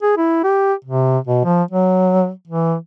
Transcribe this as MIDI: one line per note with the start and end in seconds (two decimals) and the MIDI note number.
0.02 0.12 68
0.17 0.40 64
0.44 0.73 67
0.84 1.18 48
1.27 1.41 47
1.44 1.63 53
1.71 2.30 54
2.47 2.75 52